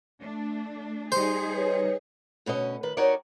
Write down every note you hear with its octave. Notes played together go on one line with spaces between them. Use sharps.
A3 D4
G3 D#4 G#4 C5 C#7
B4 C#5
D2 B2 C#4 D#5
D#3 B4
D#4 F#4 G4 A#4 C#5 D5